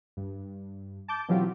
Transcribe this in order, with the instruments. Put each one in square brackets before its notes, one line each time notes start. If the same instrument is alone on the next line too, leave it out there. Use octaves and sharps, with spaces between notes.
[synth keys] G2
A5 D6 G6
B2 E3 F#3 C4 F4 G4